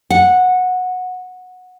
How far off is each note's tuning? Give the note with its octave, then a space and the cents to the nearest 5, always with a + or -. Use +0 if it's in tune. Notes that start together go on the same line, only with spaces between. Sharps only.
F#5 -15